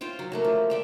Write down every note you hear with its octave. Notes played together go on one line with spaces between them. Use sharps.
F4 C5 C#5 G5
F#3
F#3 A3 A#3
F3
D5 E5 G5